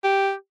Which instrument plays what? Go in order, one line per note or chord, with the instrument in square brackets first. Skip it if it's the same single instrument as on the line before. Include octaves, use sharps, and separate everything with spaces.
[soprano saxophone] G4